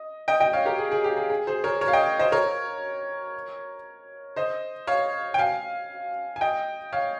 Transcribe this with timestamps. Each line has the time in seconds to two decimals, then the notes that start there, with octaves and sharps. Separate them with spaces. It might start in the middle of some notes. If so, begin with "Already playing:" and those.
Already playing: D#5
0.28 D#5 G5
0.40 D#5 G5
0.53 C#5 F5
0.65 G4 A#4
0.79 G#4
0.92 G#4
1.04 G4
1.17 G#4
1.30 G#4
1.47 G#4 C5
1.64 A#4 C#5
1.81 A#4 C#5
1.88 F5
1.93 D#5 G5
2.19 C5 D#5
2.32 A#4 C#5
4.36 C5 D#5
4.87 C#5 F5
5.34 G5
5.38 F5 G#5
6.36 G#5
6.41 D#5 G5
6.92 C#5 F5